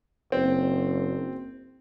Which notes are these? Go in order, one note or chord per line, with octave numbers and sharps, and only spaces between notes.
F#1 C4